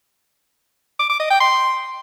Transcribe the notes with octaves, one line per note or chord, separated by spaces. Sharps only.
D6
D6
D#5
G5
C6